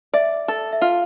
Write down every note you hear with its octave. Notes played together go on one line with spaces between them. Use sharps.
D5 E5
A4
E5
F4 F5